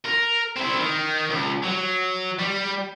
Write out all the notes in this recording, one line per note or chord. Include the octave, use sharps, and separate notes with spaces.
A#4
C4 E4
D#3
C#2
F#3
G3